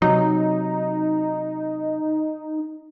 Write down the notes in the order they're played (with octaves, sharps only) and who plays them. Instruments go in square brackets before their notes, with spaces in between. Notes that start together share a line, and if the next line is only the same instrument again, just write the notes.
[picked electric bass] C3 F#3 [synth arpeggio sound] D#4